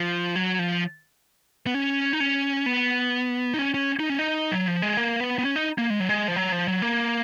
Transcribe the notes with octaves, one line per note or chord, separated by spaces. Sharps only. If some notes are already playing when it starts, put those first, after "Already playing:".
Already playing: F3
F#3
F3
B3
C#4
D#4
C#4
B3
D#4
C#4
C#4
D#4
C#4
D#4
F#3
F3
G#3
A#3
B3
B3
C#4
D#4
A#3
G#3
F#3
G#3
F3
F#3
F3
F#3
A#3